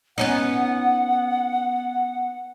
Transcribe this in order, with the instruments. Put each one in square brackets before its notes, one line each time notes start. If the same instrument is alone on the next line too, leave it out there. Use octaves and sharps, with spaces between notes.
[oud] B3 C#4 D#4 [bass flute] F#5